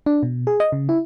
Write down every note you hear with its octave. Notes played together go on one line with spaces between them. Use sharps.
D4
B2
G#4
D#5
C#3
E4